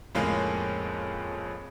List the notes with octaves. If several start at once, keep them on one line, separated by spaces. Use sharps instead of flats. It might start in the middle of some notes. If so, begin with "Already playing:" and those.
F2 A2 C#3 G#3 A#3 C#4